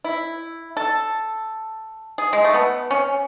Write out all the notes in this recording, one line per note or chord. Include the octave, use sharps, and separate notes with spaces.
E4
A4
G#4
G#3
A3
B3
C#4